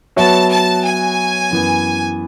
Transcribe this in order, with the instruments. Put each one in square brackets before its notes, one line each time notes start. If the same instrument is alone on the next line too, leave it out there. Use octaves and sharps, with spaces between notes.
[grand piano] F#3 B3 F#4 C#5 E5 [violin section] A5
[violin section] A5
G#5
[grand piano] F#2 E3 B3